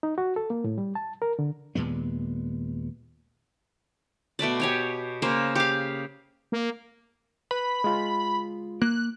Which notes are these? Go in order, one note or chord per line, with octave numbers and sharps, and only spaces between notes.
D#4
F#4
A4
A#3
A2
G3
A5
A#4
D3
D#2 A#2 G#3 B3
B2 A3 B4 D5
G4 C#5 G#5
C#3 A#3 C5
G4 F5
A#3
B4 B5
G#3 F4
A#3 F#6